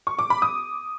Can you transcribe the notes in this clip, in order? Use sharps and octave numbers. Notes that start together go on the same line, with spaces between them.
C#6
D6
B5
D#6